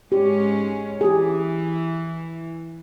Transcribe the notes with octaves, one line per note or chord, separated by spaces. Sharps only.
G#2 G#3 C#4 G4
E3 G4 G#4